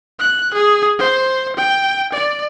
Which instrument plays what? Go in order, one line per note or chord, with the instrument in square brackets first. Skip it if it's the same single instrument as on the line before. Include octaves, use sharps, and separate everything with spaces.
[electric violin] F#6
G#4
C5
G5
D5